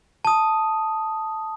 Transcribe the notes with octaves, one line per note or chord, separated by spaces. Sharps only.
A5 D#6